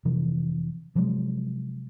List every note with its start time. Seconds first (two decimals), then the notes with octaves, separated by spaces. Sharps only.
0.05 F1 C3 E3 F3
0.95 C3 F3 F#3 G#3